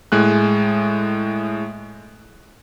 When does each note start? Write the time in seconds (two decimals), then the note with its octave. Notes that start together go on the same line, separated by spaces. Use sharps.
0.12 A2 G#3 G#5 F#6